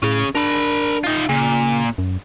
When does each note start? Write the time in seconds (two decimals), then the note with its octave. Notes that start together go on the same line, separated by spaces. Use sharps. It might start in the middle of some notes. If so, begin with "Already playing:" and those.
0.03 A2 C#4 G#4
0.35 D4 A#4 B5
1.04 D#4 F4
1.29 A#2 C#3
1.98 F#2